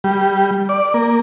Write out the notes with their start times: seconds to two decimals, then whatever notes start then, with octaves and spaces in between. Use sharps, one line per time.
0.04 G3
0.69 D5
0.94 A#3